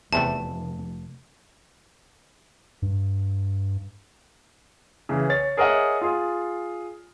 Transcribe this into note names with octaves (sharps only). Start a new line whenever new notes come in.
F1 E2 C3 A3 A5
G2
C#3 E3
C#5 A6
G#4 A#4 C#5 D#5 E5 F#5
F4 G#4